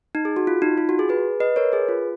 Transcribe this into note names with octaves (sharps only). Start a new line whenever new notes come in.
D#4
G#4
F#4
F4
D#4
F4
F#4
G#4
G#4 B4
B4 D#5
A#4 C#5
G#4 B4
F4